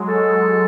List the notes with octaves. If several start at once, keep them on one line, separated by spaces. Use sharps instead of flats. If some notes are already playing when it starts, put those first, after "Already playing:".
Already playing: F#3 G#3
A4